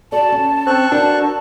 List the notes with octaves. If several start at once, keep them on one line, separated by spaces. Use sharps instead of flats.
F#4 A4 D5 A5
C#4
C4 A4 C#6 F#6
D4 F#4 A#4 C5